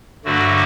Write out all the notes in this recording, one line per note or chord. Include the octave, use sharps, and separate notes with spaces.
G2 D3 F#3 A3 F#4